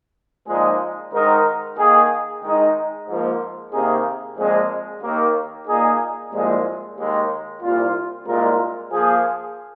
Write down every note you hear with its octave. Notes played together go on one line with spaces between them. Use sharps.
A#2 F3 G#3 D#4 G#4
G#2 D#3 G#3 D#4 A#4
D#3 A#3 G#4
D#3 G#3 D#4
G#2 F3 A#3
C3 D#3 A#3 D#4 G#4
A#2 F3 G#3 C4
D#2 D#3 A#3
A#2 A#3 D#4 G#4
C2 A#2 F3 G#3
D#2 D#3 G#3 D#4
C2 A#2 A#3 F4
C2 A#2 G#3 F4 A#4
F3 A#3 G#4